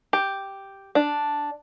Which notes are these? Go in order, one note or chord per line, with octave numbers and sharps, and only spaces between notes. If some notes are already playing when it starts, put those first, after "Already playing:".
G4
D4